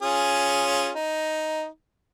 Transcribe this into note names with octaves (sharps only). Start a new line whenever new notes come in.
C#4 F4 G#4
D#4